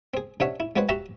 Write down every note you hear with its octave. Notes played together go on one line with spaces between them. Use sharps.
C4 G#4
C3 C#4 D4 C#5 E5 F#5
E4
G#3 C4 F#4 B4 C#5 F#5
F#4 G4 E5 F#5 A5 A#5